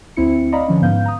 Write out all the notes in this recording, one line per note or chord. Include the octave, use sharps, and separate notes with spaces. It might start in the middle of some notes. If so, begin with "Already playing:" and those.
D2 C4 E4 C#7
D5 D#5 F5 A#5 B5
D3 F3 C#4
G#2 B3 F5 G6
A#5 D#6